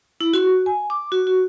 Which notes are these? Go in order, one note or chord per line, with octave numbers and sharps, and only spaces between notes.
E4
F#4
G#5
D6
F#4
F#4